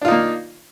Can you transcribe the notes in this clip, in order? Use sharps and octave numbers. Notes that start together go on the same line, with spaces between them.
A#3 D4 D#4 F4